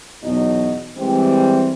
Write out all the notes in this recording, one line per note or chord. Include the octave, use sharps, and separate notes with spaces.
E2 B2 F#3 D#4 D#5
E3 G3 G#3 C4